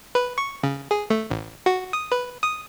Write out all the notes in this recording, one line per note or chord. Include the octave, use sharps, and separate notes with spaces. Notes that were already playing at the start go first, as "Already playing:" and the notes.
B4
C#6
C#3
G#4
A3
A1
F#4
D#6
B4
D#6